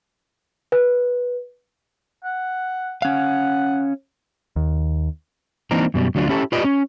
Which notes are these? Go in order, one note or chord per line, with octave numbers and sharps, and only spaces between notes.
B4
F#5
C#4 F5 F#5
D#2
E3 A#3 C4 D4 D#4 A#4
F#2 B2 G3
D2 F#3 D4 F4
C#4 E4 G4 A4
F4 G4 B4 D5 D#5
C#4